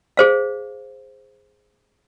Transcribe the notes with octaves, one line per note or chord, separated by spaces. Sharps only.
G#4 C5 F5